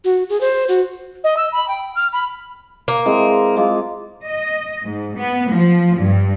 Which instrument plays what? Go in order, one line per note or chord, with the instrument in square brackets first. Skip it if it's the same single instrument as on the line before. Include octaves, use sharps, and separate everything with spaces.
[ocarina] F#4
G#4
C5
F#4
[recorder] D#5
E6
B5
G5
F6
B5
[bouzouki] A#3
[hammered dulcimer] E3 G#3 C4
G#3 F4 D6
[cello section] D#5
G#2
B3
F3
G2